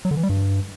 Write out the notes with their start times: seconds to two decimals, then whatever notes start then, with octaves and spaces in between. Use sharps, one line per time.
0.05 F#3
0.11 D3
0.17 E3
0.23 G3
0.29 G2